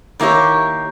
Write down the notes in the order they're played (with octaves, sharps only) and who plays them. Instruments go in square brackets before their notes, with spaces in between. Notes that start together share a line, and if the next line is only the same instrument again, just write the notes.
[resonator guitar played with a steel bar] D#3 A#3 E4 G4 C#5